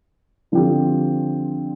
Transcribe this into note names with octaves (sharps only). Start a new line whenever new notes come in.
D3 F3 C4 G4